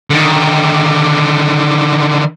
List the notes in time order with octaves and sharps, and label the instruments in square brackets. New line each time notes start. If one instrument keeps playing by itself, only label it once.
[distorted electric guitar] D3 D#3